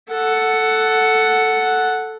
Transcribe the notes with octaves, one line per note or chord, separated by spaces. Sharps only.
A4 F#5